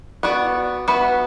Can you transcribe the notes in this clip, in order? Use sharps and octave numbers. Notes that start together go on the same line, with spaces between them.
B3 F#4 D5
B3 F#4 B4 E5